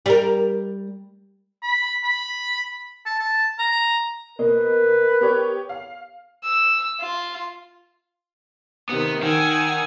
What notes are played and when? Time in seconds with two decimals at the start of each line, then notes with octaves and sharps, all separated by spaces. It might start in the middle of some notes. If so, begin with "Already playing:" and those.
0.06 G3 A#4
1.63 B5
2.04 B5
3.06 A5
3.20 A5
3.59 A#5
4.39 B2 A#3 A#4 B4 D#5
5.21 B3 G4 C#5
5.69 F5
6.44 E6
7.00 F4
8.90 C3 D#3 B3
9.23 D#3 F#5 G#5 E6